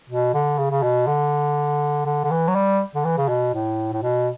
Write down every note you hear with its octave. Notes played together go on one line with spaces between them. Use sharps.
B2
D3
C#3
C#3
B2
D3
D3
D3
E3
F#3
G3
D3
E3
C#3
B2
A2
A2
B2